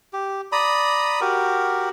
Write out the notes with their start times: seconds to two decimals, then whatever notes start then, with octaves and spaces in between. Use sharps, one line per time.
0.13 G4
0.52 D5 A#5 B5 D#6
1.21 F#4 G4 A#4